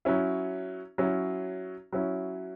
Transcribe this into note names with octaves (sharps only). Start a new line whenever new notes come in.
F#3 C#4 E4
F#3 C#4 E4
F#3 C#4 E4